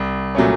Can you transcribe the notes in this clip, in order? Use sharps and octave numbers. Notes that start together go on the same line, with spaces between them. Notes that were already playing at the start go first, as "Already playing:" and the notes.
Already playing: C2
A#2 F#3 A3 C#4